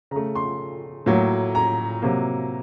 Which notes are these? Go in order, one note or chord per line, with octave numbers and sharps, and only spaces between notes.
C#3 A3 A#5
C6
A2 F#3 A#3
A#5
C3 F#3 A#3